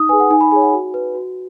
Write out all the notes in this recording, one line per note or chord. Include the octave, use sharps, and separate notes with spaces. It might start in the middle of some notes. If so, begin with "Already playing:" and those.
Already playing: D#4 D#6
G#4 B4 G#5
F#5
D#4 G#5
B5
G#4 C#5 G#5
F#5
F#4
B4
F#4